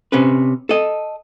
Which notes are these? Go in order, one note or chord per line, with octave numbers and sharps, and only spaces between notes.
C3 C#4 B4
A4 D#5